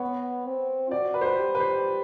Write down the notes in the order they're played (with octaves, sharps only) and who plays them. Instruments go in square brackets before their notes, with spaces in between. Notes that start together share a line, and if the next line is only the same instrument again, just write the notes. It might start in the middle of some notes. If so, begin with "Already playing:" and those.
Already playing: [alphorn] B3 [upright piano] C#5
[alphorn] C4
[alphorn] F#4 [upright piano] D5
[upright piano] B4
C5
B4
[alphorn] G4
[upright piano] B4
C5